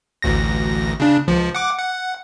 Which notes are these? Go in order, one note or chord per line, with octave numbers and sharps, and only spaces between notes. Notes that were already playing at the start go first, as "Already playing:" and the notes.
A1 D2 A#6
C#3 D4
C#2 F3
F#5 D6
F#5